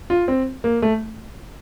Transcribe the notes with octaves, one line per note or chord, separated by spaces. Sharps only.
F4
C4
A#3
A3